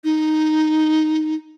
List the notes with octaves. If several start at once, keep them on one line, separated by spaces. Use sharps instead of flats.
D#4